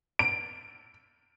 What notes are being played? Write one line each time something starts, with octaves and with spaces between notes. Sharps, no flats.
D7